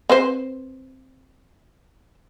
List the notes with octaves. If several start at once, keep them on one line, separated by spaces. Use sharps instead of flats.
C4 B4 C5